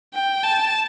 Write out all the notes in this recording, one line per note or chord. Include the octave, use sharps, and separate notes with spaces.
G5
A5